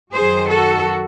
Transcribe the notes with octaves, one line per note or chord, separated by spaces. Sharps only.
F#2 D#3 F#3 G#4 C5
F#4 A4